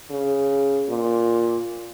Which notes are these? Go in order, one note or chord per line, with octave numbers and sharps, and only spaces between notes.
C#3
A#2